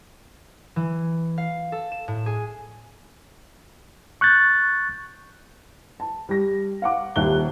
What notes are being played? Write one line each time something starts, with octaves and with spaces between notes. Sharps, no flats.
E3
F5
A4
E7
A2
G#4
C#6 F#6 G6 A6
A5
G3 A#6
F5 F#5 D6
D#1 D#2 E5 F#6 G7